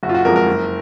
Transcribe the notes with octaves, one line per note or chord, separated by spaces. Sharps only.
F#1 F#4
F4
F#4
F2 F3 G#3 A#4
A#4
F#1